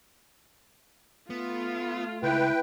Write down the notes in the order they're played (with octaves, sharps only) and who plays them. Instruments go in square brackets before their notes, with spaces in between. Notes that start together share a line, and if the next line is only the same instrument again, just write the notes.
[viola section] A3 F4 [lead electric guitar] B3
[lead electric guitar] C#2 [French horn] E4 [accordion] B4 G5